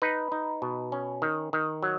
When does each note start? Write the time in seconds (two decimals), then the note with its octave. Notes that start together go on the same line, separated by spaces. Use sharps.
0.02 D#4 B4
0.32 D#4
0.62 B2
0.92 C#4
1.22 D#3
1.53 D#3
1.83 F#3